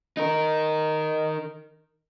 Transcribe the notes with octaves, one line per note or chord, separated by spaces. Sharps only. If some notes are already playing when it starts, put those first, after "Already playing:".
D#4 A#4